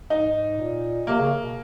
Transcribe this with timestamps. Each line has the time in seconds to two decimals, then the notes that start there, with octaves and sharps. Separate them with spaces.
0.10 G#2 D#4
0.58 A#2
1.07 C3 A#3
1.19 C#3
1.42 B2